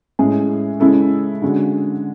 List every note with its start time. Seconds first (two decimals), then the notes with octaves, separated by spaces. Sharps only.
0.19 A2 G#3 C#4 G#4
0.80 C#3 G#3 C#4 E4 A4
1.42 D3 G#3 C#4 F#4